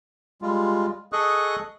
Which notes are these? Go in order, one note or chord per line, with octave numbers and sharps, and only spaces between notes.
G3 G#3 F4
G#4 A4 D#5 C#6 D#6 F#6